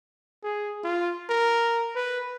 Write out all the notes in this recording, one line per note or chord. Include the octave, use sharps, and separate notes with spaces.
G#4
F4
A#4
B4